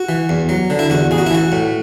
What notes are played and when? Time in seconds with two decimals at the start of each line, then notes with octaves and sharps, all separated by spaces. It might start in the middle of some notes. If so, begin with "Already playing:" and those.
Already playing: F#4
0.09 E3
0.29 E2
0.49 F#3
0.70 D3
0.79 E4
0.90 E2 F#4
1.11 A1 G#4
1.18 F#4
1.26 E4
1.31 E3 F#4
1.52 A2